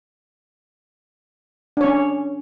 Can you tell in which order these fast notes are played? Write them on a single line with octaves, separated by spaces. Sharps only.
D4 C#5 C#4